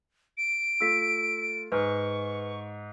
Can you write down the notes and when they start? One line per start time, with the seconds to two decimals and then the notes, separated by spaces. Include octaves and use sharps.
0.38 D7
0.80 A3 F4 E6 B6
1.72 G#2 B4 G#5 C#6 F6